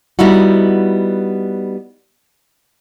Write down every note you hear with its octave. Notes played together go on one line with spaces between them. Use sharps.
G3 B3 D#4 E4 F#4